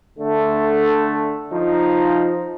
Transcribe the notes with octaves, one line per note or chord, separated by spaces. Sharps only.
D3 A3
F3 D#4